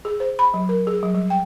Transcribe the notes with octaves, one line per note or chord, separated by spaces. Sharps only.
G#4
C5
B5
F#3
A#4
G#4
F#3
G3
G5